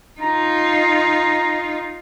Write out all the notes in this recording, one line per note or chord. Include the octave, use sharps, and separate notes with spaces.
D#4 F4 A#5